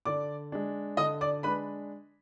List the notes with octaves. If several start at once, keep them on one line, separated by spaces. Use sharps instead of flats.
D3 D5 D6
G#3 D4
D3 D#5 D#6
D5 D6
G#3 D4 B4 B5